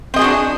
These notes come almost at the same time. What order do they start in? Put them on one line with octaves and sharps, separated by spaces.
C4 D#5 G#4 F#4 D4